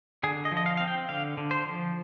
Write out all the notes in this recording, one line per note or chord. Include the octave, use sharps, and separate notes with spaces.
D3 G#4
D#5
F3
D#5
F5
C4 F5
G5
D3 F5
D3
C5
F3